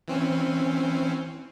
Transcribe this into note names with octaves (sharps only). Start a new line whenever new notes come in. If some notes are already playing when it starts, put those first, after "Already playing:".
E3 C4 C#4